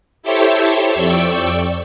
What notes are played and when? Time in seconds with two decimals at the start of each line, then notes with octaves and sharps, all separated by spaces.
0.23 E4 G4 A4 C5 C#5 E5
0.93 F2 D5 G5 C#6 E6